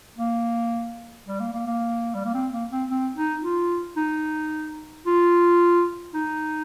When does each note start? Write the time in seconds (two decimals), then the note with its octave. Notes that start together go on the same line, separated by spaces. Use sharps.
0.19 A#3
1.27 G3
1.40 A#3
1.54 A#3
1.67 A#3
2.15 G3
2.25 A#3
2.34 C4
2.53 A#3
2.71 C4
2.89 C4
3.16 D#4
3.43 F4
3.97 D#4
5.06 F4
6.15 D#4